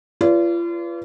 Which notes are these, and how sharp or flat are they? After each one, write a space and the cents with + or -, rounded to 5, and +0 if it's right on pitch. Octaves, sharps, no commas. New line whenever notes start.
F4 -40 B4 +0 D5 -35